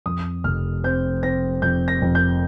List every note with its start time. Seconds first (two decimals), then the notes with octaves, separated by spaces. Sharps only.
0.06 F2 D#6
0.44 F1 F6
0.84 C4 G6
1.23 C4 A#6
1.62 F2 G6
1.88 A#6
2.02 F2
2.15 G6